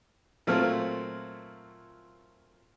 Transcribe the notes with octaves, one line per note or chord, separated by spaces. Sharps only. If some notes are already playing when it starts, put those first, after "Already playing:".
A#2 F#3 A3 C4 F4 F6